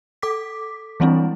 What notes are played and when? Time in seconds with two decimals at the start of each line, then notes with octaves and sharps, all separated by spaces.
0.22 A4 D6 B6
1.00 E3 G3 G#3 C4 D4 E4